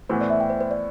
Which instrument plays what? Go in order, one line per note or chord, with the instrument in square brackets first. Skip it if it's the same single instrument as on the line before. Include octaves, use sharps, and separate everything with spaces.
[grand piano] A2 E3 B3 [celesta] C5
[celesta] D5
E5
G5
C5
C5
D5